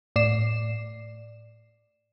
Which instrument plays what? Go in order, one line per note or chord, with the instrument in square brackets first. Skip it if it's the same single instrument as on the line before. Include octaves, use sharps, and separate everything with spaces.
[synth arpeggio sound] A2 D5 C7 E7